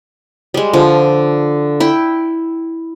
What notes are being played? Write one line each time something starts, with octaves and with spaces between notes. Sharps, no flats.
G3 G#3
D3 F3
E4 G5